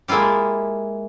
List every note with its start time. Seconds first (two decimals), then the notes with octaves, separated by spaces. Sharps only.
0.08 G#3 A#3 E4 F4 G4